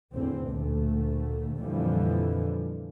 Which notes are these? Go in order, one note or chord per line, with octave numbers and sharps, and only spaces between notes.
A1 E2 D3 C4
D2 A#2 A3
F2 A#2 D3 E3 F3 G3